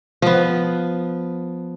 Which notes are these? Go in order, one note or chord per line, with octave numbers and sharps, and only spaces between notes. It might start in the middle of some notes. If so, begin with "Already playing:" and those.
F3 B3